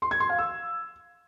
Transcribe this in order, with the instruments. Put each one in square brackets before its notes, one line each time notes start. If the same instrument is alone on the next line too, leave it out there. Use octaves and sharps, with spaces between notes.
[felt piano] C6
G#6
C6
F5
E6